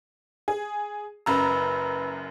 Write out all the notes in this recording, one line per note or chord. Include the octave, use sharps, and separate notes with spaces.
G#4
F#1 F#2 B4 A#5 B5 E6